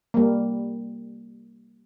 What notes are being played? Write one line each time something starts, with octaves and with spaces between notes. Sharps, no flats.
G3 A#3